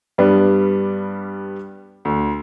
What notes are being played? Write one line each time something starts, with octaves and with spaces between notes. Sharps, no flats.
G2 G3 B3 D4
D2